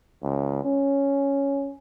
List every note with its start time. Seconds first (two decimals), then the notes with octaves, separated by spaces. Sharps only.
0.23 C#2
0.65 C#4